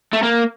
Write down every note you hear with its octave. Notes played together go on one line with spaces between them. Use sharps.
A3
A#3